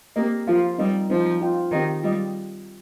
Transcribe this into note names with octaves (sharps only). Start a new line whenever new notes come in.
A#3 C4 G4 A#4 D#5
F3 F4 A#4 F5
G3 C4 D#4 A#4 D#5
F3 C4 D#4 C5
F4 D#5 G5
D#3 C4 G4 D#5 G5
G3 F4 D#5 G5